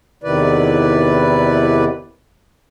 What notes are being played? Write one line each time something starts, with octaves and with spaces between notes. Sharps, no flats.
E2 C3 D#3 E4 B4 D5